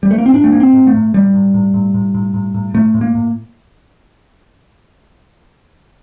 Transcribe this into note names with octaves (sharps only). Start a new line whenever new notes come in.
G3
A3
A#3
C4
A2 D4
A3
A2 A#3
C4
A2
A3
A2
A2 G3
A2
A2
A2
A2
A2
A2
A2
A2 A3
A2
A#3
A2